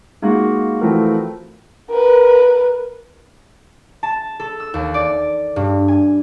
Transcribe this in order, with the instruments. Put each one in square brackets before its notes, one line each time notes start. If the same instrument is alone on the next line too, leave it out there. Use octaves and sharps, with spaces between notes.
[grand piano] G#3 A#3 D#4 F4 F#4
E3 F3 A3 C4 F#4 A#4
[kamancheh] A#4 B4
[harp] A5
A4
E6
D#2
D5
G2
G#5